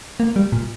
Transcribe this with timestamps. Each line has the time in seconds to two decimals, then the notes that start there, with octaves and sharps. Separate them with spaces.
0.20 A#3
0.36 G3
0.52 A#2